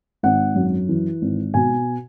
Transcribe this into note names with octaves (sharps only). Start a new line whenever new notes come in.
G#1 F#5
F#2
E3
G#1
B2 G#5